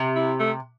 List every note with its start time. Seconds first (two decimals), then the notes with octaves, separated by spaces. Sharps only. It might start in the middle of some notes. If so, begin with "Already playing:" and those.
Already playing: C3
0.16 E4
0.39 A3